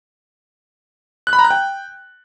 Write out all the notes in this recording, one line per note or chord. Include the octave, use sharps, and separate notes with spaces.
F#6
B5
A#5
F#6
G5